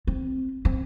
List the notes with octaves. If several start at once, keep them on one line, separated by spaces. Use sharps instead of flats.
C4
C4